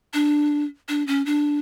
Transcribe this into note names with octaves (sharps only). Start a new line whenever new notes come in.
D4
D4
C#4
D4